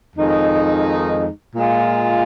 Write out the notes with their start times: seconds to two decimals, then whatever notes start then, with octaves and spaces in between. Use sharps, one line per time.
0.16 F2 D#3 G#3 D#4
1.56 A#2 G#3 F4